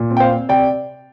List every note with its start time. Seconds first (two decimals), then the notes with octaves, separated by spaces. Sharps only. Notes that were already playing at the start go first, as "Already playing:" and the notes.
Already playing: A#2
0.11 C4
0.17 G5
0.20 C5 F5
0.31 C4
0.49 C3 D5 G5